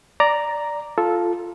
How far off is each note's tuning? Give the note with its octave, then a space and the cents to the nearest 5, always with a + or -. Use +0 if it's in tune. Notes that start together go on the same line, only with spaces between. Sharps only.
D5 +0 A#5 +0
F4 +0 A4 -10